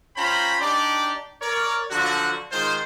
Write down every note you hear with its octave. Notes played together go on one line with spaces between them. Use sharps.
C#4 F4 C5 G5 A#5 B5
D4 D#4 G4 D5
A#4 C#5 D5
D3 F3 F#3 F#4
D#3 G#3 F4 C5